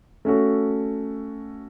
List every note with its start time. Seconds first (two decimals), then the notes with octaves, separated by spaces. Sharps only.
0.25 A3 C#4 F#4 A4